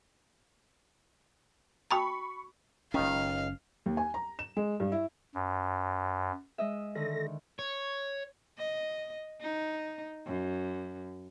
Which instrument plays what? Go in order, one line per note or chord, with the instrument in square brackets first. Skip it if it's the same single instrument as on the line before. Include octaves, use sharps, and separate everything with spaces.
[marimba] F#4 G5 A5 [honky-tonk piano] B5 C#6
[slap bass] F#1 C#4 [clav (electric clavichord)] C#2 D#3 [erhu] F5
[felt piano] D#2
G#5
A#5
E7
G#3
G2
E4
[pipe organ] F#2
[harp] G#3 D#5 E5
[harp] D3 D#3 [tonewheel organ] A4 A#6
[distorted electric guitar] C#5
[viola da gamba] D#5
D#4
F#2